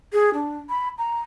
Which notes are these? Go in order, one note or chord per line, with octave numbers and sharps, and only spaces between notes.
G#4
D4
B5
A#5